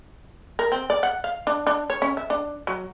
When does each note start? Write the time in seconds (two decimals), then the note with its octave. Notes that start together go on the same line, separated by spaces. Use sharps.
0.59 A#4
0.72 C4
0.90 D5
1.03 F#5
1.24 F5
1.47 D4
1.67 D4
1.90 C#5
2.02 C#4
2.17 E5
2.30 D4
2.67 F#3